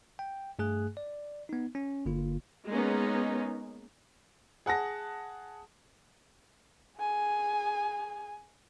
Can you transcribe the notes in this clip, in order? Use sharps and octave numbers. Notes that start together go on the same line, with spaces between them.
G5
G2 A3 G#4 G#5 F#6
D5
B3 D#4
C#4
G1 D3 A#3 F4
G#3 A#3 B3 C#4 D#4
G#4 F#5 A5 A#6
G#4 G#5